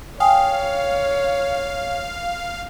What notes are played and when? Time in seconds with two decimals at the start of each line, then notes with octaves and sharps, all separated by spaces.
0.20 C#5 F5 G5 G#5 D#6